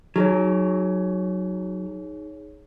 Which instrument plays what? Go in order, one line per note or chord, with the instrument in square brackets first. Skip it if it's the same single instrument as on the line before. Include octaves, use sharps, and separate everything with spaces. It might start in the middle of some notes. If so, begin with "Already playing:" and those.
[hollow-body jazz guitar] F#3 [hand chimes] D#4 G#4 C#5